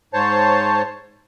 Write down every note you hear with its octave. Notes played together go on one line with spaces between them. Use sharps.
G#2 C5 C#5 A5